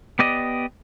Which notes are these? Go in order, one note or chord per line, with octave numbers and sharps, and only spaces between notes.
B3 G4 D5 D#5